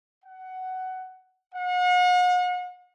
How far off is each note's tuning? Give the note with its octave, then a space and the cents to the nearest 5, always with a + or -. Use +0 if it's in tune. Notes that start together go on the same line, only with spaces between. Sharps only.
F#5 +15
F#5 -40